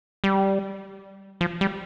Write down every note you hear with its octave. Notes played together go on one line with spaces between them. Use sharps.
G3
F3
G3